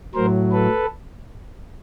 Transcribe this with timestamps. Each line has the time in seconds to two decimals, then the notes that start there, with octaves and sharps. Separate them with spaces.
0.14 A2 F#3 A#4 C5
0.52 A4 B4